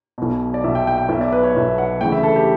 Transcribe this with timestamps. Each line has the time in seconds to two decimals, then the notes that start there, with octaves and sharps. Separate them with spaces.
0.18 B1 B2
0.54 D5
0.64 B1 B2 E5
0.75 G5
0.87 G5
0.98 G5
1.09 B1 B2 E5
1.21 D5
1.32 B4
1.43 C#5
1.55 B1 B2 E5
1.78 F#5
2.01 D2 C#3 E3 G5
2.12 E5
2.23 A4
2.36 G4